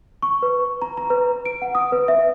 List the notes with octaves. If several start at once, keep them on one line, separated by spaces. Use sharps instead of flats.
C#6
B4
A#5
A#5
B4
D7
F#5
D#6
B4
E5